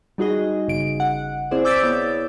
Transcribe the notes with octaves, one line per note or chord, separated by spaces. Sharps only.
G3 D#4 F#4 G#4 D#5
G1 C#3 D7
F#5
C4 E4 G#4 C5 D5
D6 E6 G6 A6 B6 D7
B3 E4 C#5